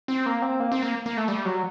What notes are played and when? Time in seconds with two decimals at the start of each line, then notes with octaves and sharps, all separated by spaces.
0.08 C4
0.26 A#3
0.42 C4
0.60 A#3
0.72 C4
0.83 A#3
1.06 A#3
1.17 A3
1.28 G3
1.45 F#3